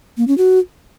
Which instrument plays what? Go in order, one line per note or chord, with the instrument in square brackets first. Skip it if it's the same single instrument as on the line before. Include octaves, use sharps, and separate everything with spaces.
[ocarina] A#3
C#4
F#4